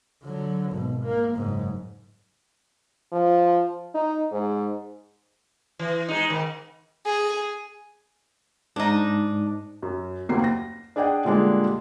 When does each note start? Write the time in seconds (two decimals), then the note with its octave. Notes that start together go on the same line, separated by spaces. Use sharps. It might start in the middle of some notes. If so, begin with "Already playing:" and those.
0.23 D3 F#3
0.73 G#1 B2
1.04 A#3
1.35 F#1 G#2
3.12 F3
3.95 D#4
4.32 G#2
5.79 E3
6.08 G#3 D#4
6.27 G#2 D#3
7.06 G#4
8.76 G#2 D4 D#4
9.82 F#2
10.29 F#1 D#2 A#3 F#4 C7
10.44 A#6
10.96 D4 G#4 D5 D#5 F#5 G5
11.25 A#2 D3 G3 G#3 D4